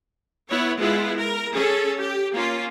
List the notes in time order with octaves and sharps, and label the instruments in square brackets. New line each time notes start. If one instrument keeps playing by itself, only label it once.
[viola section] B3 E4 C#5
G#3 B3 E4 F4
A#4
C#4 G#4 A4
G4
A#3 C#4 F4